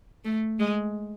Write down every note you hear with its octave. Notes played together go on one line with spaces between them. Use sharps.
A3
G#3